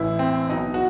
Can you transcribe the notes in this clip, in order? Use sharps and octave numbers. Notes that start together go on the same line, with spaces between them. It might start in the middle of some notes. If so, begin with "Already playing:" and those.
Already playing: A1 A2 E3 E4
C4
B1 B2 D#4
F#4